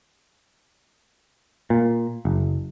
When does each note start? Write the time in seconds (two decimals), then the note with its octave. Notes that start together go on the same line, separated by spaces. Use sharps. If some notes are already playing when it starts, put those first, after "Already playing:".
1.70 A#2
2.25 F#1